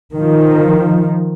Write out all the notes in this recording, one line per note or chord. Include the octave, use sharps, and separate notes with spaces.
D#3 F3